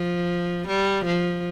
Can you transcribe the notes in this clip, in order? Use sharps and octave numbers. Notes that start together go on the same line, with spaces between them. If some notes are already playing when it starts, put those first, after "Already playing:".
Already playing: F3
G3
F3